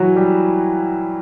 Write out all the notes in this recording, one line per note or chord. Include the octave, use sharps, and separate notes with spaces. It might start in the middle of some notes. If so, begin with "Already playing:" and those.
Already playing: E3 F#3 E4 F#4
G3 G4